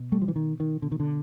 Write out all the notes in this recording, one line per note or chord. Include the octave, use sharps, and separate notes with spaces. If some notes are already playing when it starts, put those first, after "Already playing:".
Already playing: B2
G3 A3
F3
E3
D#3
D#3
B2 D3
D#3
D3